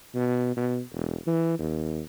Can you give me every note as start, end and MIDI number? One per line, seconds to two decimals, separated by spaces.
0.15 0.55 47
0.57 0.80 47
0.93 1.16 28
1.27 1.56 52
1.59 2.01 39